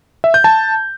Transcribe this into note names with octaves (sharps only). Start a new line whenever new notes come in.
E5
G6
A5